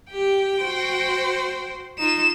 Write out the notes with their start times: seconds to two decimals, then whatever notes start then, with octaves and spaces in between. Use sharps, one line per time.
0.12 G4 G5
0.62 F#4 C5
1.99 D#4 F4 E7